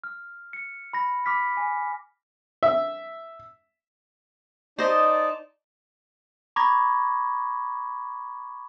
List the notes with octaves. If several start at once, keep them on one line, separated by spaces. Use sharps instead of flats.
F6
C#7
B5 A#6
B5 D6 F6 B6
G#5
E5
D#4 C5 D5 D#5 A5
A#5 B5 C#6 D6 G#6 A#6